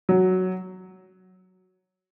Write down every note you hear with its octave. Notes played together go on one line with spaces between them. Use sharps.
F#3